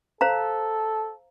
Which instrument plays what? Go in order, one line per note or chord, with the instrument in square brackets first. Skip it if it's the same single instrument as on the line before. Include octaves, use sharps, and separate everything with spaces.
[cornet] A4 [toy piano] C5 F5 A#5